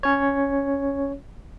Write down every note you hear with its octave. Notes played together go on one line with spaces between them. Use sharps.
C#4 C#5